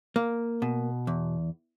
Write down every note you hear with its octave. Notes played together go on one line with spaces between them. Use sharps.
A#3
B2
E2